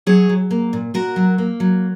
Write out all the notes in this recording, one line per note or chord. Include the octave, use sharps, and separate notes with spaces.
F#3 G#4 C#5
F#3
A#3
A#2
A#2 F#4 A#4
F#3
A#3
F#3